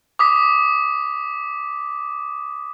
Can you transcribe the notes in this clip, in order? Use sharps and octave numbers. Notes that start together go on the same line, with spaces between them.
D6 D#6 B6